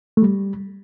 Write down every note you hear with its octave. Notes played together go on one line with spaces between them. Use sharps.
A3
G3